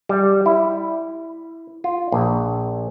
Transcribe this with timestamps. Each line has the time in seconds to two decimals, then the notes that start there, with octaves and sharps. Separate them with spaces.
0.09 G3
0.46 E4
1.84 F4
2.12 A#1